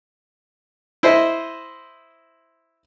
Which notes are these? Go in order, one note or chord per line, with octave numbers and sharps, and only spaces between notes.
E4 C5 D#5